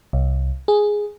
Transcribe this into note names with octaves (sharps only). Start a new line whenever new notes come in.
C2
G#4